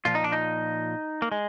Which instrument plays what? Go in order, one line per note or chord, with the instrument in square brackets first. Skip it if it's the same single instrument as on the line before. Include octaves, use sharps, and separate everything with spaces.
[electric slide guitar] A#2 F3 F4
D#4
D4
D#4
A#3
G#3